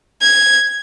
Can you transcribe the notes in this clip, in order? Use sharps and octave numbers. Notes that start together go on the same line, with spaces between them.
G#6